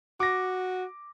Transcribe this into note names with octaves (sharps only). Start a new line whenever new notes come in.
F#4 D6 A#6